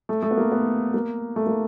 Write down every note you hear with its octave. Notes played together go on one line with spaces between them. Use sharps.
A3
A3
B3
A#3
B3
A#3
A3
A#3